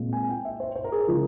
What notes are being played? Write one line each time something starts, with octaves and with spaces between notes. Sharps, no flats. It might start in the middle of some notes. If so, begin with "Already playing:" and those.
Already playing: A#2 G#3 C4
G#5
G5
E5
C5
C5
A#4
G#4
A#4
C#3 F3 G#3